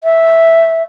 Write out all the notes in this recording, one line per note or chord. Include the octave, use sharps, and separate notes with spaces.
E5